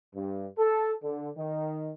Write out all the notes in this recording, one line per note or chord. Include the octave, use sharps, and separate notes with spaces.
G2
A4
D3
D#3